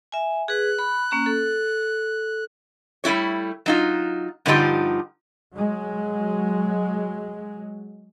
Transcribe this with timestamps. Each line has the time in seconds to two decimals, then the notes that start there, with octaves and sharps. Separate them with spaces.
0.12 E5 G#5
0.48 G#4 B4 F#6
0.79 B5
1.11 A#3 C#4 A#5
1.26 A4
3.04 G3 A3 E4 F#4 C#5
3.66 F#3 D#4 F4
4.46 G2 D3 F3 D#4 F4 G4
5.55 F#3 G#3